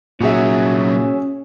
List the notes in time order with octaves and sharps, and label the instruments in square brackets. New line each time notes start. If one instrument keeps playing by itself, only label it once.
[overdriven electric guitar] C2 F#3 [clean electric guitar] A#2 D#4 [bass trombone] C#4 [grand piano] F#4 G#4 E5